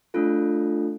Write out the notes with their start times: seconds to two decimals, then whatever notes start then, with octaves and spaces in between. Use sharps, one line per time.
0.14 A3 D4 F4 A4